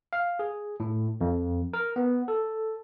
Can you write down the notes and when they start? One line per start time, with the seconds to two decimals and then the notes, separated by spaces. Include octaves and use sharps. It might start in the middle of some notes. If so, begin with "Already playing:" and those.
0.13 F5
0.39 G#4
0.80 A2
1.21 F2
1.73 A#4
1.96 B3
2.28 A4